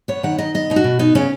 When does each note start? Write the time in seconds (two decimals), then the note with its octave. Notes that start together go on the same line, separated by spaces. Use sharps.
0.08 B3 C#5
0.23 D#3 F#5
0.38 D#3 D#5
0.54 B3 D#5
0.70 B2 D#4
0.76 F#4
0.84 B2
0.99 B3 D#4
1.15 C#3 C#4